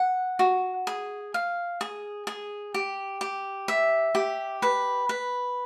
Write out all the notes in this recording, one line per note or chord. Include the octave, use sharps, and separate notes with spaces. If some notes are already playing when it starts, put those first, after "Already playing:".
Already playing: F#5
F#4
G#4
F5
G#4
G#4
G4
G4
E5
G4
B4
B4